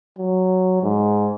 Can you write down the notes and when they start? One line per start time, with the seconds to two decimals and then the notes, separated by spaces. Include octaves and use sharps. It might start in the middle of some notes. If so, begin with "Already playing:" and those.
0.19 F#3
0.83 G#2